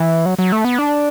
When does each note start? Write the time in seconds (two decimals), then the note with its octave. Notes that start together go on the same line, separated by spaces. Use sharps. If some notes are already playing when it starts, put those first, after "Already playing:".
Already playing: E3
0.26 F#3
0.39 F#3
0.52 A3
0.65 B3
0.79 D4